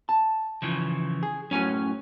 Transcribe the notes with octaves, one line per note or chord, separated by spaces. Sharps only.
A5
C#3 E3 F3
G#4
F#2 A2 F#3 C#4 G#5